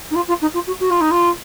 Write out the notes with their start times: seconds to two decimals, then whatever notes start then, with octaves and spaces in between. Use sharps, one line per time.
0.11 D#4
0.15 F4
0.28 F4
0.41 D#4
0.54 F4
0.67 F#4
0.80 F#4
0.90 F4
1.01 D#4
1.11 F4